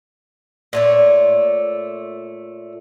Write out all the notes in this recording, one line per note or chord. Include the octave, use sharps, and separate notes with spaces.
A#2 A3 C#5